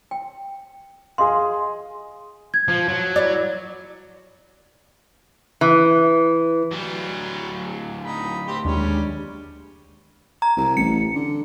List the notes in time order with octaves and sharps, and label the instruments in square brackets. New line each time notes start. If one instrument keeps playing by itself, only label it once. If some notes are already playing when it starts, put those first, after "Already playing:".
[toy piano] G5
[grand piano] G#4 D#5 F5 [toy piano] C6
[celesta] G#6
[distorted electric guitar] F3
F#3
[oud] E4 C#5 D5
[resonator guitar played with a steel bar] E3
[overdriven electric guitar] D2 F#3 [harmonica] G3
[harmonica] D#4 [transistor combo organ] B5
[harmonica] C4 G4
[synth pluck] D#2 [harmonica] G3 C#4 [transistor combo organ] G#3 D4
[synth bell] A#5
[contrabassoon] C2
[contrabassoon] A1 [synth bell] C#7
[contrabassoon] D3